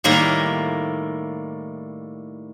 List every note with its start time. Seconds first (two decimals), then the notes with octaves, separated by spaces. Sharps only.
0.04 A2 D#3 G3 A#3